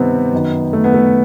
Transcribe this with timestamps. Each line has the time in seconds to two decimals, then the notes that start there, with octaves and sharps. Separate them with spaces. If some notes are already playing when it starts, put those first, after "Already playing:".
Already playing: G2 C3 D#3 B3 C4
0.33 F#2 D#3
0.73 A3
0.84 B3
0.94 A3